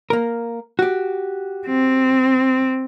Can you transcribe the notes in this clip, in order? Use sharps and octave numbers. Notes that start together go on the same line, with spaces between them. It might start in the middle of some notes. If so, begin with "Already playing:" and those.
A#3 A#4
F#4 G4
C4